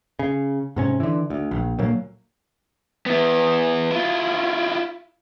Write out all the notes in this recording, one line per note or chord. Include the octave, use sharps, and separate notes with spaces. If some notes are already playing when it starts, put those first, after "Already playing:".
C#3
G#2 C3 C#4
D3 E3
D2
A#1
D2 A#2 F#3 A#3
B3 E4
E4 F4